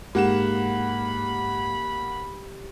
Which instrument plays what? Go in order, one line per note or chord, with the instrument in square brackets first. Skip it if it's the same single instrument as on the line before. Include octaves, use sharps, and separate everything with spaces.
[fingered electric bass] G#2 [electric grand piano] A#3 F#5 E7 [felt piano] G4 [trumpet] B5